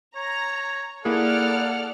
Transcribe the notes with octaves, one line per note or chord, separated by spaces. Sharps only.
C#5 A#5
A#3 E4 G#4 A4 D5 F#5 F6